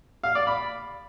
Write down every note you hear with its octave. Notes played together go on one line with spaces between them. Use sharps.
F5
D5
B5